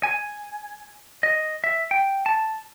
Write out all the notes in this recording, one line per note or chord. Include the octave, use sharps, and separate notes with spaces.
G#5
D#5
E5
G5
A5